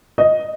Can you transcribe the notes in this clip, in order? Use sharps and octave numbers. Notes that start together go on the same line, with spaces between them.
D#5